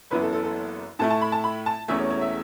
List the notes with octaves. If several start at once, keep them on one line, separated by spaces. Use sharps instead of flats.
F#1 F#2 E3 B3 E4 B4
A4
A4
A4
A2 A3 E4 A5
A5
B5
A5
B5
A5
E1 E2 E3 A3 C#4 E5
C#5
C#5
E5